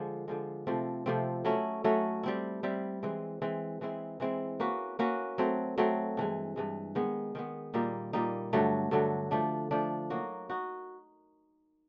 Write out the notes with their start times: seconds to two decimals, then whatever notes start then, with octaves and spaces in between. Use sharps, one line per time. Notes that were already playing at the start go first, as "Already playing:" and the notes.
Already playing: D3 F3 G#3
0.28 D3 F3 G#3
0.67 C3 F3 A3 C4
1.06 C3 F3 A3 C4
1.45 F#3 A3 C#4 E4
1.84 F#3 A3 C#4 E4
2.23 G3 C4 E4
2.63 G3 C4 E4
3.03 E3 G#3 C4
3.42 E3 G#3 C4
3.81 E3 G#3 C4 E4
4.20 E3 G#3 C4 E4
4.60 A#3 C#4 F#4 B4
4.99 A#3 C#4 F#4 B4
5.38 F#3 A3 C4
5.78 F#3 A3 C4
6.17 G2 E3 G#3
6.56 G2 E3 G#3
6.95 D#3 G#3 B3
7.35 D#3 G#3 B3
7.74 A#2 G3 A#3 D#4
8.13 A#2 G3 A#3 D#4
8.53 G2 D3 F#3 A3
8.91 G2 D3 F#3 A3
9.31 F3 A3 D4
9.71 F3 A3 D4
10.10 F#3 A#3 D#4 F#4
10.50 D#4 F#4